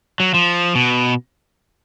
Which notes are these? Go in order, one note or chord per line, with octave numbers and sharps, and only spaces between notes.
F#3
F3
B2